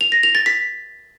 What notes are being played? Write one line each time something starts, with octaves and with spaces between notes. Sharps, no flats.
F7
A#6
F7
A6
B6